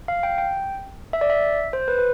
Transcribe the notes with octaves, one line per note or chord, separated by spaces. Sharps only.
F5
G5
G5
E5
D5
E5
C5
B4
B4